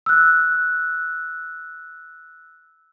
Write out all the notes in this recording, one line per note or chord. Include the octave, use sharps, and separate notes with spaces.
E6 F#6